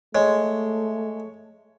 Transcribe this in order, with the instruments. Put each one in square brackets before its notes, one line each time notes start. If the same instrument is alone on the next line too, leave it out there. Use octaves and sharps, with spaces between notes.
[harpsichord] G#3 [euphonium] A3 [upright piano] C#5